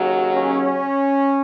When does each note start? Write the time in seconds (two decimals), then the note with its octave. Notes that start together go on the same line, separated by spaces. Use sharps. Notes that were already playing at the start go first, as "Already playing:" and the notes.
Already playing: D#2 C#3 F#3
0.34 C#4